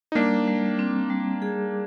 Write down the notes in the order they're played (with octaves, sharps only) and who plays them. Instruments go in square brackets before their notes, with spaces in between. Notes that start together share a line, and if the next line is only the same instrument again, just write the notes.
[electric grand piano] D#4
[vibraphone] G3 [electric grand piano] A#3 D4
[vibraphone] G3
C4
G3
G#4